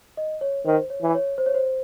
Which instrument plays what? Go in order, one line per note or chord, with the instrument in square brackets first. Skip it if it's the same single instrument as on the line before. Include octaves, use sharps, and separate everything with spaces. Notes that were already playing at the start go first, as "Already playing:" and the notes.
[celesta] D#5
C#5
[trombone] D#3 [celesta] C5
[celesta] C#5
[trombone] E3
[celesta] C#5
C5
C#5
C5